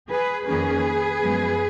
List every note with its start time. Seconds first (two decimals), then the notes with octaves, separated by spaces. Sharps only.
0.09 G#4 B4
0.46 F2 D#3 A#3 C#4 G#4 B4
1.22 F#2 F3 G#3 B3